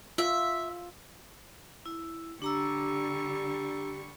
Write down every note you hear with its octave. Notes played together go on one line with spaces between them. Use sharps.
F4 E5
E4
D3 G3 D4 G4 A#5 C#6 E6